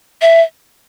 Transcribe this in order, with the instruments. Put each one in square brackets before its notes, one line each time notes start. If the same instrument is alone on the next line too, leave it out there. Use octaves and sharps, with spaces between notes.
[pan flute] E5